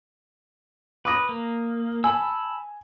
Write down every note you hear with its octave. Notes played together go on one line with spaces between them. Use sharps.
B4 D6 D#6 A#6
A#3
G#5 A5 B5 E6